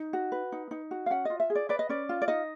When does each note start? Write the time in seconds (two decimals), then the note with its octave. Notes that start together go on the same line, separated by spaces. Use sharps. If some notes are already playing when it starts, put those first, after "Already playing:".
Already playing: D#4
0.13 F#4
0.32 B4
0.52 D#4
0.71 D#4
0.91 F#4
1.06 F5
1.10 C#4 F#5
1.25 F4 D#5
1.40 E5
1.50 G#4
1.55 D5
1.69 B4 D5
1.79 D#5
1.89 C#4 D5
2.09 F4
2.22 D5
2.28 D#4 D#5